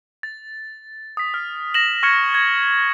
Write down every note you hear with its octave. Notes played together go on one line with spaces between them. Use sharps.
A6
D#6 B6
F6
A#6 E7 F#7
C#6 F6 G#6 C#7 E7
G#6